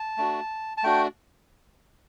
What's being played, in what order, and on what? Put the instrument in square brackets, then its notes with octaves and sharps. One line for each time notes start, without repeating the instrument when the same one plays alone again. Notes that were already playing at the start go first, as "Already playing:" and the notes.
Already playing: [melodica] A5
A3 D4 F#4
A5
A3 D4 F#4 G5